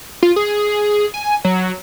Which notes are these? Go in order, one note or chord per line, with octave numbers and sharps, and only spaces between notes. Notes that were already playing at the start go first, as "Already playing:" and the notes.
F4
G#4
G#5
F#3